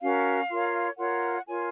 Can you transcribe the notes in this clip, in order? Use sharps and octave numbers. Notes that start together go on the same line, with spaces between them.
C#4 F#4 A#4 F5
F4 A#4 C#5
F4 A#4 C#5 F#5
F4 A#4 C#5 G#5